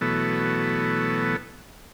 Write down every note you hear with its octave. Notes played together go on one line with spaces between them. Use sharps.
B2 E3 F#3 A3 B3 A4